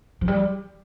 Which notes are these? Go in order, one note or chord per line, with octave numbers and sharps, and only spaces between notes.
F3
G3